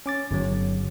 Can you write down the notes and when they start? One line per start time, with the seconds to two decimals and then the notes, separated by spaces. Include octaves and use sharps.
0.06 C#4 D6 A6
0.31 G1 F#3